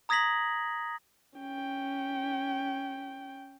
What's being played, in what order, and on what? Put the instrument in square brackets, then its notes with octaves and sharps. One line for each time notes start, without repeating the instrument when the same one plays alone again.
[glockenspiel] A#5 D#6 G#6 A#6 B6 F#7
[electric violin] C#4 G5